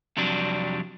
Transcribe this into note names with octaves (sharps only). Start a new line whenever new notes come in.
F2 C3 F#3 G3 D4